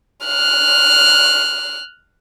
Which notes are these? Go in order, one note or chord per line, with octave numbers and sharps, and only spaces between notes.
F6 F#6